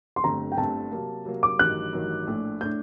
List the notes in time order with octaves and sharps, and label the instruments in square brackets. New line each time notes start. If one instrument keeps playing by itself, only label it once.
[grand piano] C6
[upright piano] G1 G2 D3 A3 C4 [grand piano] A#5
[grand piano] G5
[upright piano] G1 G2 D3 A3 C4 [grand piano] A5
[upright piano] C3 F#3 A#3
C3 F#3 A#3
[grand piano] D6
[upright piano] A1 G2 D#3 F#3 [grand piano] F#6
[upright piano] A1 G2 D#3 F#3
A#1 A2 A3 D4
[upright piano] A2 A3 D4 [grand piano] G6